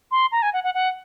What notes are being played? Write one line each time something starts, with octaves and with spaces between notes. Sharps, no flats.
C6
A#5
G#5
F#5
F#5
F#5